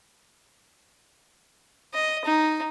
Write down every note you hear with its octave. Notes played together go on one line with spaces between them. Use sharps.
D#5
D#4